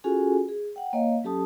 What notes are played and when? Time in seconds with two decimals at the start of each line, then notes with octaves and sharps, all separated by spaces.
0.04 C#4 F4 F#4 G#4 A4 G#5
0.49 G#4
0.76 F#5 G5
0.93 A#3 C#5 D#5 F5
1.24 F#3 C#4 G4 A4 A5 D#6